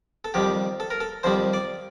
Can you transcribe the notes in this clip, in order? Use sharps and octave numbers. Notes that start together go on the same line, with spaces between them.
A4
F2 D#3 G3 G4
A4
A#4
A4
F2 D#3 G3 C5
D5